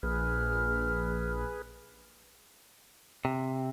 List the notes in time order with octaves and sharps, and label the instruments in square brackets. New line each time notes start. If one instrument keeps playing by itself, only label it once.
[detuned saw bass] A#1 [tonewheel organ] G#4 B4 [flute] F6
[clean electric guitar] C3